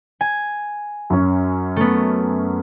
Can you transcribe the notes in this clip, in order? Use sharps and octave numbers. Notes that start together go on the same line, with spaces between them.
G#5
F#2 C#4
A3 B3